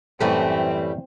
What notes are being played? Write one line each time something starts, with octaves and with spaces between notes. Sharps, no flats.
F#2 A2 E3 G3 A3 C4 E5